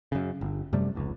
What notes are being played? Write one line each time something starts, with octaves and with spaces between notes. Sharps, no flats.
F#2 C#3
G1
F#2 C3 G3 A3
F1 C#2